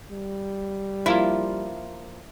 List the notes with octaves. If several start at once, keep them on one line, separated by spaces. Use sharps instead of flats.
G3
F3 A#3 E4 F4